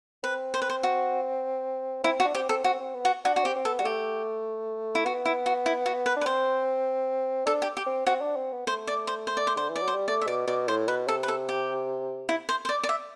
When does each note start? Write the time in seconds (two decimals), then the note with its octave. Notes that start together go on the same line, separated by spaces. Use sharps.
0.24 C4 B4
0.54 C5
0.62 B4
0.70 C5
0.83 F#4
2.04 C4 E4
2.20 F#4
2.25 D4
2.35 C4 G4
2.49 C4 A4
2.64 C4 F#4
2.80 C4
2.95 B3
3.05 F#4
3.25 D4 F#4
3.36 F#4
3.44 C4 G4
3.56 C4
3.65 B3 A4
3.79 G3 F#4
3.85 A3 G4
4.95 E4
5.05 B3 F#4
5.25 E4
5.46 F#4
5.66 E4
5.86 F#4
6.06 B4
6.16 D4
6.21 B4
6.26 C4 C5
7.46 D4 A4
7.62 G4
7.77 G4
7.87 C4
8.07 C4 F#4
8.21 D4
8.37 C4
8.52 B3
8.67 A3 C5
8.87 D5
9.07 C5
9.27 C5
9.37 D5
9.47 C5
9.57 D3 C5
9.70 E3
9.76 D5
9.82 F#3
9.88 C5
9.94 G3
10.08 A3 D5
10.21 E5
10.27 B2 D5
10.48 B2 D5
10.68 A2 C5
10.88 B2 B4
11.08 C3 A4
11.23 B4
11.28 A4
11.49 G4
12.29 E4
12.49 C5
12.65 C5
12.69 D5
12.83 D5
12.89 E5